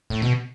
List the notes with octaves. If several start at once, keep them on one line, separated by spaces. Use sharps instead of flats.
A2
B2